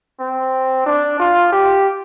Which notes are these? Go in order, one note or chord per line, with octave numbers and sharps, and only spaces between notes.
C4
D4
F4
G4